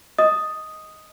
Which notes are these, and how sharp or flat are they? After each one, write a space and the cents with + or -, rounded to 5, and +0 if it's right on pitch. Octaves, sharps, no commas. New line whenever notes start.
D#5 +10 D#6 +0